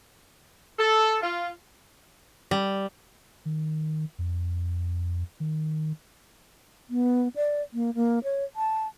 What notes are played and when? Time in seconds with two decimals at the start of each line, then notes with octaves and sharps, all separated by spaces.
0.79 A4
1.22 F4
2.51 G3
3.45 D#3
4.19 F2
5.40 D#3
6.90 B3
7.36 D5
7.74 A#3
7.95 A#3
8.24 C#5
8.56 A5